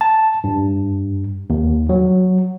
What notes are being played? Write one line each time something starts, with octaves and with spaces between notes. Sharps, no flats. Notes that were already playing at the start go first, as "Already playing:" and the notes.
A5
G2
D#2
F#3